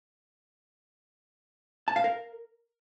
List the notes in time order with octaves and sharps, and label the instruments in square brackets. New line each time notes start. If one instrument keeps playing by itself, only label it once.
[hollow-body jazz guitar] A5
F5
A#4